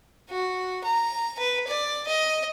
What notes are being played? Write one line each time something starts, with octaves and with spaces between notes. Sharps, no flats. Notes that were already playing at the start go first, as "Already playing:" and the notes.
F#4
A#5
B4
D5
D#5